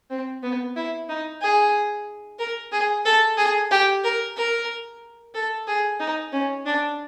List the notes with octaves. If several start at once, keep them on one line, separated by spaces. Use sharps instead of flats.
C4
B3
E4
D#4
G#4
A#4
G#4
A4
G#4
G4
A#4
A#4
A4
G#4
D#4
C#4
D4